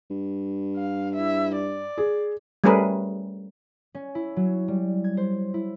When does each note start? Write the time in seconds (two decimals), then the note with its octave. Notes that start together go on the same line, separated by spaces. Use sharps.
0.10 G2
0.77 F5
1.16 E4 E5
1.55 D5
1.98 G#4
2.64 G3 A3 C#4 G#4 A#4 B4
3.95 C#4
4.15 E4
4.36 F#3
4.68 G3
5.04 G#6
5.17 C5
5.54 E4